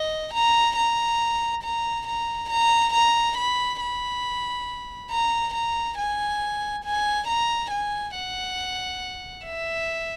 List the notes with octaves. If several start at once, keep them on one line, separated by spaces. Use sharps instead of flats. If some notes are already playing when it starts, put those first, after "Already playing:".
Already playing: D#5
A#5
A#5
A#5
A#5
A#5
A#5
B5
B5
A#5
A#5
G#5
G#5
A#5
G#5
F#5
E5